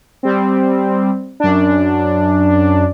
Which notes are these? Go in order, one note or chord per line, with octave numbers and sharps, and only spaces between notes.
G3 C4
F#2 D4